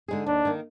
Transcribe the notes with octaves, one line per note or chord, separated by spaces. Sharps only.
D3 G#3 D#4 G#4
D#2 D4
D#3 A#3